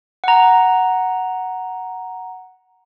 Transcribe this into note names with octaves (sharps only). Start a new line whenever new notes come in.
F#5 A#5